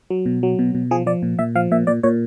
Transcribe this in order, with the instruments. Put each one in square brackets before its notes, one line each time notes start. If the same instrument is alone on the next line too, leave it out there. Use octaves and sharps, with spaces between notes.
[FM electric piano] F#3
B2
F#3
B2
B2
F3 G#4
F3 D5
A#2
A#2 E5
F3 F5
A#2 E5
A#2 D5
A#2 C#5